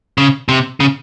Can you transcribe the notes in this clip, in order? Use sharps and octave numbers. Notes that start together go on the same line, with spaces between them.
C#3
C3
C#3